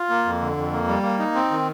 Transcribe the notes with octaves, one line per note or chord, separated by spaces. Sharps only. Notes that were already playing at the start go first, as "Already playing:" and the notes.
Already playing: F4
A#3
F2
D3
F2
A#3
G3
A#3
D#4
C4
D#3